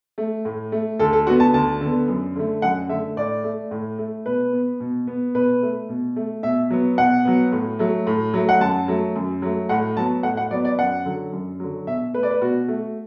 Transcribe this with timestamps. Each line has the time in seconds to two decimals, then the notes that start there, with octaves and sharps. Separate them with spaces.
0.18 A3
0.45 A2
0.72 A3
0.99 D2 A4
1.13 A4
1.26 D3 F#4
1.30 B3
1.40 A5
1.54 D2 A5
1.81 D3 B3
2.08 F#2
2.36 D3 A3
2.62 F#2 F#5
2.89 D3 A3 E5
3.17 A2 D5
3.44 A3
3.71 A2
3.98 A3
4.26 B2 B4
4.53 B3
4.80 B2
5.07 B3
5.35 B2 B4
5.62 A3
5.89 B2
6.16 A3
6.43 B2 E5
6.70 F#3 B3
6.97 B2 F#5
7.25 F#3 B3
7.52 A2
7.79 F#3 A3
8.07 A2
8.34 F#3 A3
8.49 F#5
8.60 F#2 A5
8.88 F#3 A3
9.16 F#2
9.42 F#3 A3
9.69 A2 F#5
9.97 F#3 B3 A5
10.23 A2 F#5
10.37 F#5
10.51 F#3 B3 D5
10.65 D5
10.78 F#2 F#5
11.05 D3 F#3
11.32 F#2
11.60 D3 F#3
11.87 B2 E5
12.14 A3 B4
12.23 D5
12.31 B4
12.41 B2 F#4
12.68 A3